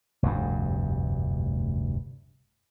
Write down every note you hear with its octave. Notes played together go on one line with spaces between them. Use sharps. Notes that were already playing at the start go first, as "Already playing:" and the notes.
F1 D2 G2